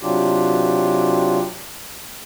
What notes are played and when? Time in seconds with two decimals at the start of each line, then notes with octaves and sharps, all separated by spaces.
0.02 C3 F#3 D4 F4 G4